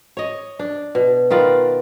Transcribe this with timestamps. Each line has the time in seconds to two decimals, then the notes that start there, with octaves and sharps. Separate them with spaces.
0.17 C#5 D#5
0.59 D4
0.95 B2
1.30 D#3 B3 F4 D5